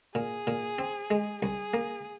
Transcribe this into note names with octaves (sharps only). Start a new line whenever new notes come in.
A#2 G#4
A#2
C4
G#3
C2 G#4
A#3